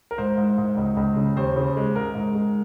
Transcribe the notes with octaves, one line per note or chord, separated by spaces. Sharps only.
A#4
G#2 C5
G#2
G#2
C#2
C#2
C#3
D#2 C5
C#3
G#3
G#2 A#4
G#2
G#3